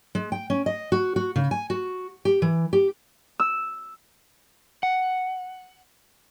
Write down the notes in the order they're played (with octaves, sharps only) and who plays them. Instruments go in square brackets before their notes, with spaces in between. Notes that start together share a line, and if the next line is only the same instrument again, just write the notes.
[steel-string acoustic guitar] G#3
G5
C#4
D#5
F#4
F#4
C#3
G#5
F#4
G4
E3
G4
[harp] E6
[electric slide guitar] F#5